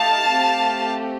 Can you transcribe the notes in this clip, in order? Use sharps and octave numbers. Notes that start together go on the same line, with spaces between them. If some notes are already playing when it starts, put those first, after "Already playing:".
Already playing: A3 D#4 G4 F5 A5
A3 C4 G4